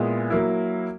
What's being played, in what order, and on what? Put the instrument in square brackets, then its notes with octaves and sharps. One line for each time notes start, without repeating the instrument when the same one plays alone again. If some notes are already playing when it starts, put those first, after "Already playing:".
Already playing: [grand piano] A#2 G#3 B3 E4
F#3 A#3 E4